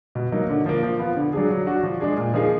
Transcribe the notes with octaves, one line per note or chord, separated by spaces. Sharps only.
B2
F#3 A#3 D#4
D3
F3 A#3
F3
B3 F4
D3
F#3 D4 G#4
F#3
D4 F#4
F3
G#3 D4 G#4
A#2
F3 A#3 D#4 G#4